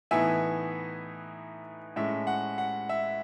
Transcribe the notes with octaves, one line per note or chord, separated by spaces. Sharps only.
A2 E3 B3 D#4 E5 G#5
A2 G#3 C#4 E5
F#5
F#5
E5